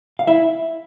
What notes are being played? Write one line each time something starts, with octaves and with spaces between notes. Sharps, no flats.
F5
E4 E5